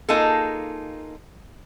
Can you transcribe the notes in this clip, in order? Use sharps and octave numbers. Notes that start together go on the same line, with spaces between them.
A#3 D#4 F4 G#4 A4